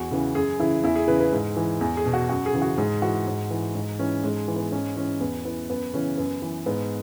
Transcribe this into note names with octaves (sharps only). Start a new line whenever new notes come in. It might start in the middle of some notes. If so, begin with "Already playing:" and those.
Already playing: E2 F#4
C#3 E3
F#2 G#4
C#3 E3 E4
E2 E4
G#4
C#3 E3 B4
B4
G#2
E3
E2
G#4
B2
F#4
F#2 F#4
G#4
C#3 E3
F#4
G#2 G#4
E3 F#4
G#2
E3
G#2
E3 C#4
G#2 G#3
E3
B3
G#2 C#4
E3 C#4
E2 B3
E3 B3
F#2 B3
C#3 E3 C#4
F#2 B3
E3
G#2 B3